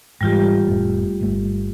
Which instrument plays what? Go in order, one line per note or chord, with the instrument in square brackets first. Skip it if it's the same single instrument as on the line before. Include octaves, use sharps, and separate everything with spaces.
[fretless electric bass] G#2 E3 [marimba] G3 F4 G4
[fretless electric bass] F1 A2
G1 A3